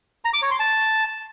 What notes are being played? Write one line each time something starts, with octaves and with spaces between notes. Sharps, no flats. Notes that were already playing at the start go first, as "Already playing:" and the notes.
A#5
D6
C#5
C6
A5